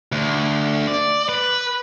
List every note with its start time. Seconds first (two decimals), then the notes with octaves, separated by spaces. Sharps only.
0.12 D2
0.87 D5
1.29 B4